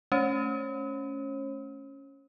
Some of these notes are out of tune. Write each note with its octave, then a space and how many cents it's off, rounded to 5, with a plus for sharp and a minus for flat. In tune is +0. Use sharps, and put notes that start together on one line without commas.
A3 -10 C#4 +0 C#5 -45